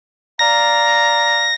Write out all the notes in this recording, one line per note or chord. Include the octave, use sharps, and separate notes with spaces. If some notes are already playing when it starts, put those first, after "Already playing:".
D5 F5 A#5 A#6